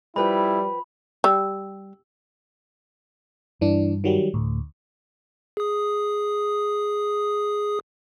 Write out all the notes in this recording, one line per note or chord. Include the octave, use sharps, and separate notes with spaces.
F3 G3 E4 B4 G5 B5
G3 E6
G2 E3 D4
D#3 F#3 G3
D2 A2
G#4 D#6